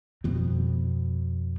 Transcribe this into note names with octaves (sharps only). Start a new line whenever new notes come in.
F2 B2